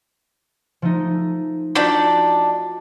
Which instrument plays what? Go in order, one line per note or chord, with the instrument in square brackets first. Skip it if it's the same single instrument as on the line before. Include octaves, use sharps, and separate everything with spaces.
[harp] F3 A3 D#4
[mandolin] D4 D#4 D5 [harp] F4 F#4 B6